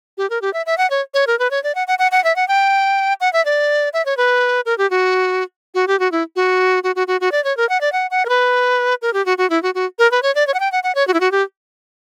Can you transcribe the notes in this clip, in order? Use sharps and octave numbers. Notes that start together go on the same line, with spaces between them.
G4
A#4
G4
E5
E5
F#5
C#5
C#5
A#4
B4
C#5
D5
F#5
F#5
F#5
F#5
E5
F#5
G5
F#5
E5
D5
E5
C#5
B4
A#4
G4
F#4
F#4
G4
F#4
E4
F#4
F#4
F#4
F#4
F#4
D5
C#5
A#4
F#5
D5
F#5
F#5
A#4
B4
A#4
G4
F#4
F#4
E4
F#4
F#4
A#4
B4
C#5
D5
C#5
F#5
G5
F#5
F#5
C#5
F#4
E4
F#4
G4